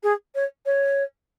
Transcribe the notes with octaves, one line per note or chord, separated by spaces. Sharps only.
G#4
C#5
C#5